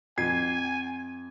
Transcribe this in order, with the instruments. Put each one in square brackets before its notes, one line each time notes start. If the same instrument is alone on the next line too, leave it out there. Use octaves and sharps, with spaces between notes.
[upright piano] F2 C7 [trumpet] G#5 [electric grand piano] G#6